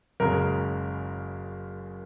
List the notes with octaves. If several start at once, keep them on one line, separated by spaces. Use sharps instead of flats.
F#1 F#2 C#3 G#3 A#4